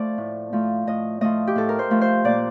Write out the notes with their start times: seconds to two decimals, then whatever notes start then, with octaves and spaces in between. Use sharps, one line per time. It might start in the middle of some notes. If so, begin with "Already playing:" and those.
Already playing: F3 A3 C5 D5
0.18 A2
0.53 F3 A3
0.87 A2 D#5
1.21 F3 A3 D#5
1.47 G4
1.56 A2 A4
1.69 A#4
1.79 C5
1.90 F3 A3
2.01 C5
2.24 A#2 D5